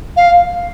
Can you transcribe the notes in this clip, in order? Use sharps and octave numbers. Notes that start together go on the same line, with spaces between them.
F5